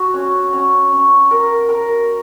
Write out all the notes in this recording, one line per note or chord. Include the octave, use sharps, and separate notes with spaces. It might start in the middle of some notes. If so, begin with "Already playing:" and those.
Already playing: F#4
C#4
C#4
C#4
A#4
A#4